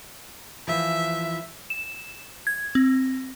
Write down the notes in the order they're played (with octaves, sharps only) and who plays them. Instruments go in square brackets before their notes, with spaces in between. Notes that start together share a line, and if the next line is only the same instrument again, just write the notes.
[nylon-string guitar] E3 F3 [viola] E5
[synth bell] E7
G#6
C4